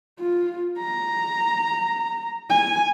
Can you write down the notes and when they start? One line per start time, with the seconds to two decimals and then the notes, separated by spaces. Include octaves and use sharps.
0.19 F4
0.78 A#5
2.50 G#5